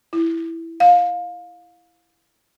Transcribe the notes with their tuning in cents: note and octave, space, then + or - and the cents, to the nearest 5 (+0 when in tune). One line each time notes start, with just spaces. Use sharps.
E4 +5
F5 +20